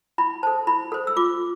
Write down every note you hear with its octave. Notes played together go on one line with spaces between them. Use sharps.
E4 B5
A4 C5 A5
E4 B5
A4 C5
E6
F4 D6